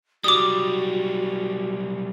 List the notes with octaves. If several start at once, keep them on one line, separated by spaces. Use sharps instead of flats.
B1 G3 F#4 D6 D#6